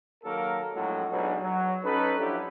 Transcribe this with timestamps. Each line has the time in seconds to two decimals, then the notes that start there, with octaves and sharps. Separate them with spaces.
0.24 D#2 F#3 A#3 A4 A#4
0.73 A#1 A2 F#3 G#3 A4
1.11 B1 G#2 F#3 D4 B4
1.41 F#3
1.83 C#4 D#4 A4 B4
2.18 G2 F3 F#3 D4 E4 G4